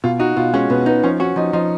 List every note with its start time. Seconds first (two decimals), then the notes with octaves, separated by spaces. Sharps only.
0.04 B2 F4
0.20 D#4 F#4
0.37 B2 F4
0.54 G#3 C#4
0.70 B2 B3
0.86 B3 D#4
1.03 F3 C#4
1.20 C#4 F#4
1.36 F3 D#4
1.53 F3 D#4